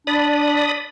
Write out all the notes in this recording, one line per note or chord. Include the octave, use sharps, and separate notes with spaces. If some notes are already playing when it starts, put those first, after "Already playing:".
D4 D5 B5 D#6